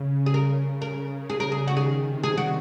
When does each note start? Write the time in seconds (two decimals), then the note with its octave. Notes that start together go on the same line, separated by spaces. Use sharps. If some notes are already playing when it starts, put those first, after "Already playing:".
Already playing: C#3
0.26 G#4
0.34 A#4
0.82 A#4
1.30 G#4
1.40 A#4
1.52 G#4
1.68 F#4
1.76 D#3 G#4
2.08 C3
2.23 G#4
2.37 F#4